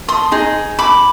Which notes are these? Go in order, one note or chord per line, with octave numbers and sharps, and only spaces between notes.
C6 D#6
D#4 G#4
B5 D6